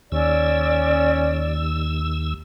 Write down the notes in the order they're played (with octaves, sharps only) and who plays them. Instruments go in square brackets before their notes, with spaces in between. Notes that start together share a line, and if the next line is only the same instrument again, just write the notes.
[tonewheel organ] D#2 E6 [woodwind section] C#4 D5